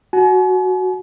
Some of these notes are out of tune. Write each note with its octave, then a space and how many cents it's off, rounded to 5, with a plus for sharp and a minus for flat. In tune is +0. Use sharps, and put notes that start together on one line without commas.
F#4 +0 G#5 +40